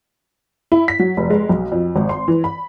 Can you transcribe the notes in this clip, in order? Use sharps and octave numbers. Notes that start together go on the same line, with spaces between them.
E4
B6
F#3
F1
G#3
B1
F2
G#1
C6
E3
B5